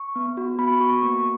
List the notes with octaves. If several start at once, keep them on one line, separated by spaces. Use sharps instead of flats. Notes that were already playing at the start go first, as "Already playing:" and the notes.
Already playing: C#6
B3
F#4
B3 B5
F#4 C#6
A#3 C#6